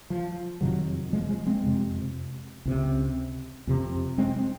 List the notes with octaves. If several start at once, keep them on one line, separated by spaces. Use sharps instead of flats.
F3
F2 C3 D#3 F#3
F3 G#3
F3 G#3
G#3 C4
F2 C3
C#2 C3
F2 C3
G#3 C4